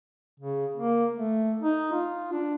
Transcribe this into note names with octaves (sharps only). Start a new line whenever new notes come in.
C#3
A#3
A3
D#4
F4
D4